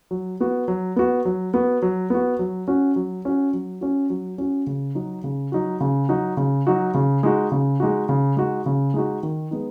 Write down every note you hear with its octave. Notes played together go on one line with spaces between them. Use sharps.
F#3
B3 F#4
F#3
B3 F#4
F#3
B3 F#4
F#3
B3 F#4
F#3
C#4 F#4
F#3
C#4 F#4
F#3
C#4 F#4
F#3
C#4 F#4
C#3
F#3 D#4 F#4
C#3
F#3 D#4 F#4
C#3
F#3 D#4 F#4
C#3
F#3 D#4 F#4
C#3
G#3 D#4 F#4
C#3
G#3 D#4 F#4
C#3
G#3 D#4 F#4
C#3
G#3 D#4 F#4
D#3
G#3 B3 D#4